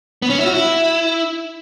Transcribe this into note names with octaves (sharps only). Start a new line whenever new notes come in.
B3
C#4
E4
F#4
E4